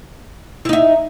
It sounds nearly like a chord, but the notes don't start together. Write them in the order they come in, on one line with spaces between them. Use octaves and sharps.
E4 D#4 E5